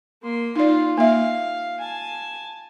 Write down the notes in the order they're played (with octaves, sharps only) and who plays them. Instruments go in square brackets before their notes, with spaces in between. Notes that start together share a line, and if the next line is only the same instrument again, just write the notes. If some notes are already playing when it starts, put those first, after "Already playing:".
[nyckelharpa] A#3 C6
[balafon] D#4 D5 [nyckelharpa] F4
[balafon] A#3 E5 [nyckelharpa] F5
[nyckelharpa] G#5 A5